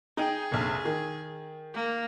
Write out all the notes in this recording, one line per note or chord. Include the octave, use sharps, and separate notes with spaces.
D#4 G#4 G5
F1 A#1
D#3
A#3